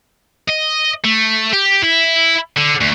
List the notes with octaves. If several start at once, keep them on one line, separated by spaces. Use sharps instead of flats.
D#5
A3
G4
E4
D3
D2